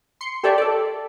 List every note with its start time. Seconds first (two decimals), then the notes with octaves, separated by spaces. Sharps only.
0.21 C6 C7 C#7
0.43 G4 A4 C#5 D5 E5
0.58 A4 D5